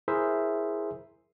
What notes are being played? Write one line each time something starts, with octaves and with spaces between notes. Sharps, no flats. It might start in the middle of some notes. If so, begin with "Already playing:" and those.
E4 G#4 A#4 C5 E5